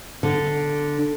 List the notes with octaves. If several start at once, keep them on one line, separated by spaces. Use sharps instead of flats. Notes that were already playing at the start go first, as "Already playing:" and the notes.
D3